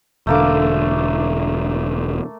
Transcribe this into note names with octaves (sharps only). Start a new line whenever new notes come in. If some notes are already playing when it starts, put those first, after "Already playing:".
E1 D3 A3 A#3 D6